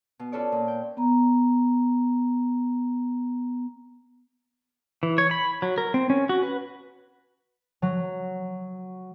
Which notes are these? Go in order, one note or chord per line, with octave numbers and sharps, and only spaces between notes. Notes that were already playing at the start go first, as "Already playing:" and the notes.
B2
C#4 F4 A4 B4 C#5 D5
A#2
G5
B3 A#5
E3
C#5
B5
F#3
A#4
C4
C#4
F#4
B4
F#3